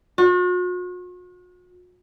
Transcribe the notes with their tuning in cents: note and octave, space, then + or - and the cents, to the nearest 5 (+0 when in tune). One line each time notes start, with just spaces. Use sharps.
F#4 -45